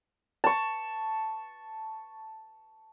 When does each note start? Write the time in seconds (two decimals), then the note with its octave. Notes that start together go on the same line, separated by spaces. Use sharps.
0.44 A5 C#6